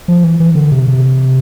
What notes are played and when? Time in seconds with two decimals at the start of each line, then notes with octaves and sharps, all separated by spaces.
0.08 F3
0.24 E3
0.40 E3
0.55 D3
0.71 C3
0.88 C3